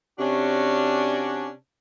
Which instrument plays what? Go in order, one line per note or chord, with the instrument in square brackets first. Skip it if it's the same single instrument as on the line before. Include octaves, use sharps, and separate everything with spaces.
[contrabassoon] C3 [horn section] C#4 D4 F#4